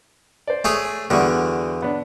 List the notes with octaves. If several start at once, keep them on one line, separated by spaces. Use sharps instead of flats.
C5 D5
A3 G#4 C#5
E2 D3 G3 F#4 C#6
B3 D4